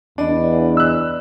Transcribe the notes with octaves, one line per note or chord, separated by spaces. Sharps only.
E2 D4 D5 D#5 B5
E6 F#6